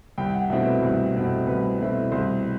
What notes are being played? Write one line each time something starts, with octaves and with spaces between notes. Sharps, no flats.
C2 G5
F#5
B2 A3 C4 E4 E5
B4
C2
B2 A3 C4 E4
C2 B4
B2 A3 C4 E4
C2 C5